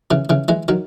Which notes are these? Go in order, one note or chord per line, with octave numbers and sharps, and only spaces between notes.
C#3 E3
C#3 E3
E3 G#3
D#3 F#3